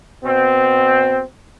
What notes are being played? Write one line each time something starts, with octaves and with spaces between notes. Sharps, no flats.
B2 C4